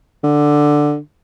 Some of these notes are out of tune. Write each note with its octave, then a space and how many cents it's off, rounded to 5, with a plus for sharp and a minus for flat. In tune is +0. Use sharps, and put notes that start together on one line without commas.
D3 +5